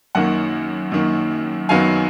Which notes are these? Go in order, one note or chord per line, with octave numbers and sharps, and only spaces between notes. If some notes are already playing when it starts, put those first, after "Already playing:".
F#2 D#3 A#3 F#5
F#2 D#3 A#3
F#2 D#3 F#3 B3 F5 G#5